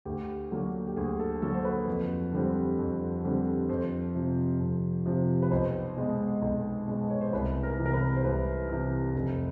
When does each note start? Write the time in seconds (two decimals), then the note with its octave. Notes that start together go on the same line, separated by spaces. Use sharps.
0.05 D2 G4
0.51 D3 F#3 A#3
0.87 G4
0.96 D2 G#4
1.20 A4
1.42 D3 F#3 A#3 A4
1.54 C5
1.65 B4
1.87 F2
2.33 D3 G3 C4
2.79 F2
3.24 D3 G3 C4
3.69 F2 C5
4.15 C3 F3
4.60 F2
5.06 C3 F3
5.43 B4
5.51 B1 C5
5.96 B2 G#3 B3
6.42 B1
6.88 B2 G#3 B3
7.10 C#5
7.21 C5
7.33 C2 B4
7.63 A#4
7.79 C3 E3
7.86 A#4
7.93 B4
8.16 C5
8.24 C2 B4
8.69 C3 E3
9.15 F1